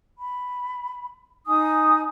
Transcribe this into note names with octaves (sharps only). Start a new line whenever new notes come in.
B5
D#4 G#5 D#6